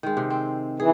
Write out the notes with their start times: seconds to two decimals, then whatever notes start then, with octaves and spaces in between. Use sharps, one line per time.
0.03 D#3 G#3
0.17 C3
0.30 C4
0.80 E3 G#4